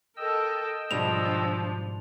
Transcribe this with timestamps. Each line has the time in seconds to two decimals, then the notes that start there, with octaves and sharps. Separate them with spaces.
0.17 A4 A#4 D#5 G5 E6
0.91 G#2 B2 F3 G3 D4 F7